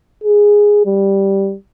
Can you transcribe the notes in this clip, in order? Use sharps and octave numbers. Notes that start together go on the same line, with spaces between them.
G#4
G3